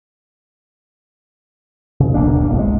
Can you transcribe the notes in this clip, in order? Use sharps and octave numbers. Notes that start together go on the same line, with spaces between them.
C#3
D#1 B1 A#3 D4
G1 C2
G#3